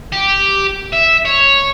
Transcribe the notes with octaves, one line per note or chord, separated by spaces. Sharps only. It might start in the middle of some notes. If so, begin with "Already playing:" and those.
G4
E5
C#5